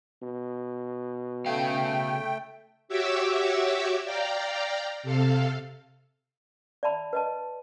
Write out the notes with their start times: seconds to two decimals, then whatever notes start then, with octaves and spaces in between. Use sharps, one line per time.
0.22 B2
1.46 C#3 A3 F5 G5
2.88 F#4 G4 C#5 E5 D6 E6
4.04 D5 F5 G5 A#5
5.03 C3 A4 F5
6.83 D5 E5 A5 B5
7.13 B4 D#5 A5